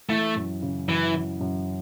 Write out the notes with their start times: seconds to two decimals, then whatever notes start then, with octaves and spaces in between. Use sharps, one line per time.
0.09 E3 A3
0.36 F#2
0.62 C#3
0.89 F#2 E3
1.15 E3
1.41 F#2